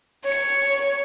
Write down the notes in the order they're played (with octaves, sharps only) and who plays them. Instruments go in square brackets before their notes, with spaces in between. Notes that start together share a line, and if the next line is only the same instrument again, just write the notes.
[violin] C#5 C#7